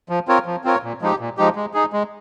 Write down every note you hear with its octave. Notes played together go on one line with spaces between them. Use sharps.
F3
C4 F4 A#4 C#5
F3
C4 F4 A#4 C#5
A#2
F3 G#3 D#4 G4
A#2
F3 G#3 D#4 G4
G#3
D#4 G#4
G#3